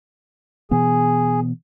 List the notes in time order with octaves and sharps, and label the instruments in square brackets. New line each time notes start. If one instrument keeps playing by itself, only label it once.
[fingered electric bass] B2 E3 B3 [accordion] G#4